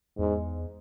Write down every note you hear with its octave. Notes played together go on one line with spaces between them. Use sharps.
E2 G#2